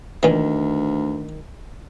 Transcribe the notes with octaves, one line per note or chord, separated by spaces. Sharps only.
D2 A#2 D#3 E3